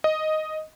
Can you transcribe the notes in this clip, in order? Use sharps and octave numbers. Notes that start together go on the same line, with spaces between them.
D#5